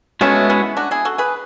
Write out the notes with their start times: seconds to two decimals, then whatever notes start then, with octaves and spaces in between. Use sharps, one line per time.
0.21 G#3 A3 B3 C#4 F#4 C#5 E5
0.50 C#4 E4
0.77 D4 F#4
0.91 E4 G#4
1.05 F#4 A4
1.18 G#4 B4